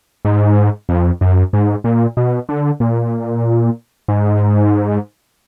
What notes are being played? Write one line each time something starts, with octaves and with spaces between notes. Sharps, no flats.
G#2
F2
F#2
G#2
A#2
B2
D3
A#2
G#2